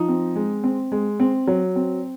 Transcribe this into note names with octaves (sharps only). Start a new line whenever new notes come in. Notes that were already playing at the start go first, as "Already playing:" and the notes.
Already playing: F3 D#4
C4
G#3
C4
G#3
C4
F#3
C4